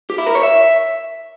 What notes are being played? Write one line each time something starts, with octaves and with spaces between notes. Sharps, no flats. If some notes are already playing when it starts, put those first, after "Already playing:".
G4
E4
A#4
C#5
E5